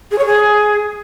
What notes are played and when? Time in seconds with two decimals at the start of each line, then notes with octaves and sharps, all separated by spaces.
0.11 G#4
0.18 C#5
0.26 G#4